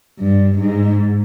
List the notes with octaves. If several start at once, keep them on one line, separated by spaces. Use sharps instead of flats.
G2
G#2